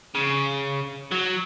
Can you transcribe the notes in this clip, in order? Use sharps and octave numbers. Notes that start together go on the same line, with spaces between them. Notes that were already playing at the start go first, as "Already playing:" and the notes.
C#3
F#3